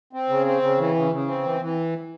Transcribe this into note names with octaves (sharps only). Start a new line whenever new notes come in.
C4
C#3
C4
C#3
E3
C#3
C#3
C4
E3
E3